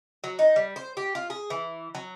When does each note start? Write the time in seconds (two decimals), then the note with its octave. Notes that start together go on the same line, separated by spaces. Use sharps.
0.24 F#3
0.39 D#4
0.56 G3
0.76 C5
0.97 G4
1.15 F4
1.30 G#4
1.50 E3
1.95 F#3